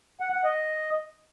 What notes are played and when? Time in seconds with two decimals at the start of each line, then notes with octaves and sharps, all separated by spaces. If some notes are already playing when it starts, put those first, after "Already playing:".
0.20 F#5
0.32 F#5
0.44 D#5